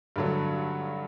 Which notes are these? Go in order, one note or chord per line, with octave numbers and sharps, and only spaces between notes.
G2 D3 F#3 A3